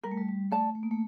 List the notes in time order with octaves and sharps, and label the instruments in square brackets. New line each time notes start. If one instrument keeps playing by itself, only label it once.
[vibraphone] G3 [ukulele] A#4
[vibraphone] A3
G3
G3
[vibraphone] A3 [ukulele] D5 A5
[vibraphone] A3
A#3
A3